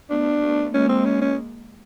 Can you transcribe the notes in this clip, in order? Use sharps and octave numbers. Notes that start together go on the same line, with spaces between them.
A3 B3 D4
A3 B3
G#3 A#3 C#4
C4
C#4
C#4